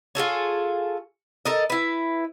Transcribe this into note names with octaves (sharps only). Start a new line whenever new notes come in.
F4 G#4 A4 C#5
A4 A#4 D#5
E4 B4